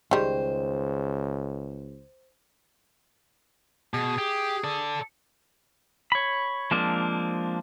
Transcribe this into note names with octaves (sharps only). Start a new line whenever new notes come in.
C#2 D#3 G3 G#4 C5
B2 G#4
G4
A4 D5
C#5 B5
F3 G#3 A#3 C4 D4